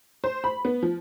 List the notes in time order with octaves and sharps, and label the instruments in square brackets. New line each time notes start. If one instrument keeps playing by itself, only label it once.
[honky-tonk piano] C5
B5
B3
F3